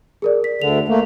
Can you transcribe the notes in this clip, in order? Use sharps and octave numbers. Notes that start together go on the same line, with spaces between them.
G#4 A#4 D5
B6
D2 D3 F7
A3 A#3